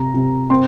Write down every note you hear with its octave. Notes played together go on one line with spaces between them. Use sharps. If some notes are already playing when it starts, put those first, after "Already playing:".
Already playing: C3 A#5
C3
C4 C6